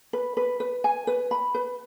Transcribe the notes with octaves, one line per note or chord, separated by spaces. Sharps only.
B4
B4
B4
G#5
B4
B5
B4